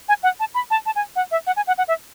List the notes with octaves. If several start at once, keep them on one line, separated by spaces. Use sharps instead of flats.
G#5
F#5
A5
B5
A5
A5
G#5
F#5
E5
F#5
G#5
F#5
F#5
E5